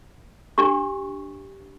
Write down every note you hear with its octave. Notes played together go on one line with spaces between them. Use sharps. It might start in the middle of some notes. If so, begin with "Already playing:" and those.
D4 G4 C#6